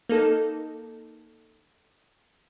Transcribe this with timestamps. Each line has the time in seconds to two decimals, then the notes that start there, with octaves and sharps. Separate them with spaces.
0.09 A#3 D#4 A4